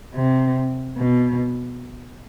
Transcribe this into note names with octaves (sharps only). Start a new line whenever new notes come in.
C3
B2